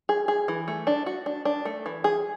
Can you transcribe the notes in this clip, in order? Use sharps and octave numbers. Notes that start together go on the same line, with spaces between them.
G#4
G#4
E3
A3
D4
F#4
D4
D4
A3
E3
G#4